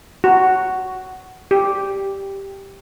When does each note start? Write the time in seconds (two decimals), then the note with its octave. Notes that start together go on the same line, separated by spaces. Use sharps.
0.24 F#4
1.51 G4